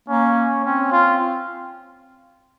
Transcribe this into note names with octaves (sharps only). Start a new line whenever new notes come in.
A#3 C#4
C4 C#4
F4